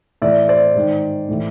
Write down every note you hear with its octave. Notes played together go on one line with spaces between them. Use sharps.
A2 E3 D5 E5
C5 D5
G#2 D#3
A2 E3